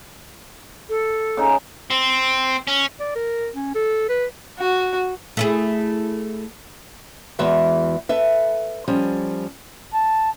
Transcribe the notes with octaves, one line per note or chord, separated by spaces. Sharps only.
A4
C#3 D#4 A#5
C4
C#4
D5
A#4
C#4
A4
B4
F#4
A3 E4 G#4
E2 E3 G#3 F#4 E5
A4 B4 E5
F3 G3 C#4
A5